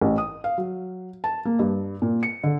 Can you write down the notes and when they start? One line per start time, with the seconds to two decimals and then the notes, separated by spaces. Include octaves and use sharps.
0.01 A1
0.18 D#6
0.44 F5
0.58 F#3
1.24 A5
1.45 A#3
1.59 G2
2.02 A#2
2.23 C#7
2.44 D3